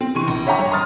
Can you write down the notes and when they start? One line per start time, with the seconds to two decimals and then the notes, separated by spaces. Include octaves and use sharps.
0.01 C4
0.15 C3 E3 C6 C#6 D#7
0.27 A#1
0.47 C#5 E5 F#5 G5 A#5 D6
0.59 G2 C#5
0.71 A#5 C6 D#6 F6 A6